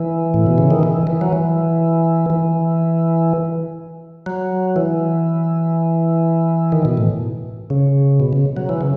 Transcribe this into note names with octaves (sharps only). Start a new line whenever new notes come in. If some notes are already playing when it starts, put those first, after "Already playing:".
Already playing: E3
A2
B2
C#3
D#3
E3
E3
F#3
E3
E3
F#3
E3
D#3
B2
A2
C#3
B2
C#3
F#3
E3
C#3